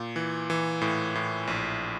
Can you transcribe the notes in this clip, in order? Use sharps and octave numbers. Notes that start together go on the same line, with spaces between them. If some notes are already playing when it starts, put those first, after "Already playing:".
Already playing: A#2
E3
E3
A2
A2
A#1